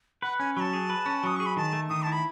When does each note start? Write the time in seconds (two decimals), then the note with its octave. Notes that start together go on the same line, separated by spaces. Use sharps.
0.22 B4 F#5
0.39 C#4 G#5
0.56 F#3 A5 B5
0.73 G#4
0.90 B4
1.06 C#4
1.23 F#3 D#6
1.36 G#4 C#6
1.46 B5
1.57 D#3 A5
1.73 A3
1.89 D#3 D#6
2.03 E4 A5
2.12 B5